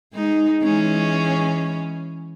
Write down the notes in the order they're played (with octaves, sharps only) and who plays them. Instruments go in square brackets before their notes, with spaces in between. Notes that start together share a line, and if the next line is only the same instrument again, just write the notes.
[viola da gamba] G#3 D#4
E3 G#3 C#4